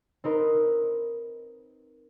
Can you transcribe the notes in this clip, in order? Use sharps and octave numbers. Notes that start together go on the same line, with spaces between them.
C4 D#4 A#4 B4